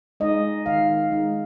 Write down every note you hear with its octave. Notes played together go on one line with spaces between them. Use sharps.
G#3 D#4 D#5
D#3 F5
G#3 D#4